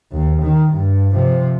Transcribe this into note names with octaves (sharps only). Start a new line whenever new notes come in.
D#2
D#3
G2
C3 F3